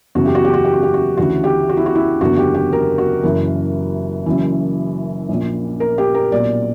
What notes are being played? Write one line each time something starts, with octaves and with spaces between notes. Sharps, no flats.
F#1 E2 C#3 E3 F#4
G4
F#4
G4
F#4
G4
F#4
G4
F#4
D2 C#3 E3 F#4
G4
F#4
E4
F#4
E4
F#1 E2 D3 F#4
G4
G4
A#4
F#4
F#1 F#2 E3 A#4
F#1 F#2 E3
A#1 A#2
A#4
G4
A#4
B1 A#2 D5